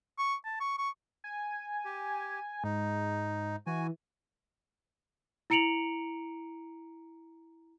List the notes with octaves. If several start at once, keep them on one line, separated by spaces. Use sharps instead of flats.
C#6
A5
C#6
C#6
G#5
G4
G#2 D#4
E3 F#4 G#5
E4 A#5 C#7 D7 F7 F#7